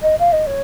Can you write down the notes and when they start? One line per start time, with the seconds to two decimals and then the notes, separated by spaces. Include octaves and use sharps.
0.02 D#5
0.19 F5
0.32 D#5
0.46 C#5